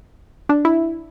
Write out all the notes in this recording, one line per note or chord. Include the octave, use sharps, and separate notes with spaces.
D4
E4